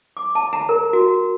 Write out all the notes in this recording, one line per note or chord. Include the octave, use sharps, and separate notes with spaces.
D6
A5
A#5
A#4
F#4